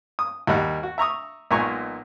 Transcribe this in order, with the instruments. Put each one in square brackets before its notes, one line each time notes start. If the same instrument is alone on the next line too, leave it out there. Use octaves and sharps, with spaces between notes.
[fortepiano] D#6
D#2 G3 D#4 F#5
F#4
E5 A#5 C#6 D#6
B1 A#2 G#3 G#5 A#5 C#6